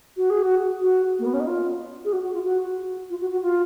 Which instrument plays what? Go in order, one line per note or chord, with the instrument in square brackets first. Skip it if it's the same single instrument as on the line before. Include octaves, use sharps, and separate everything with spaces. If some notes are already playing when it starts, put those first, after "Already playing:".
[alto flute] F#4
G#4
F#4
F#4
A#3
B3
C#4
D#4
F4
G#4
F#4
F#4
F4
F#4
F4
F#4
F#4
F4